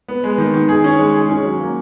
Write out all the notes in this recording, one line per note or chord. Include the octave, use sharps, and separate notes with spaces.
B3
G#3
D#3
D#3
G#4
C#4
G#3
G#4
C#4
F#3
A#3